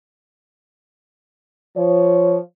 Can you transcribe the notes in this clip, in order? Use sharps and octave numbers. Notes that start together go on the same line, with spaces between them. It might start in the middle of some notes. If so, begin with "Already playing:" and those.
F3 C#5